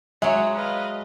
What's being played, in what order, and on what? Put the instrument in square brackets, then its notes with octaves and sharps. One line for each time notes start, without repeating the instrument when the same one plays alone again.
[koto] F#3 G#3 [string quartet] F#4 C#5 [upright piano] E5
[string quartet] B4 D#5 F5